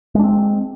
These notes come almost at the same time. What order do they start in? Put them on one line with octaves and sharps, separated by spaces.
G#3 D4 C4